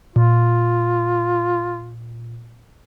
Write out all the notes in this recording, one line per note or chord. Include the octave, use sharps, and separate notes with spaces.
A#2 F4